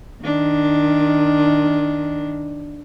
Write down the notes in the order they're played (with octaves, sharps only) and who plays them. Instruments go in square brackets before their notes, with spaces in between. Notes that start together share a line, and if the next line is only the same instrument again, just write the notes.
[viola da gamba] D#3 D4